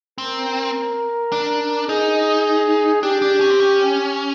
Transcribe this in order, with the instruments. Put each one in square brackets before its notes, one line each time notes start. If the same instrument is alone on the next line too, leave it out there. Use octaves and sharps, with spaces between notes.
[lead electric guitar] C4 [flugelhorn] A#4
[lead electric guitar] D4
[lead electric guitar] D#4 [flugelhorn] G#4
[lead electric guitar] D4 [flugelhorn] G4
[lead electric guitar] D4
C#4
C4
C#4